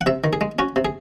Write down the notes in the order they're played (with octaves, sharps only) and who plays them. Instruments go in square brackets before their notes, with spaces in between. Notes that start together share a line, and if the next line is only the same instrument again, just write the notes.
[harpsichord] F#5
C3 E5
D#3
G#4
G#3
C#4 F#4
C3
G#4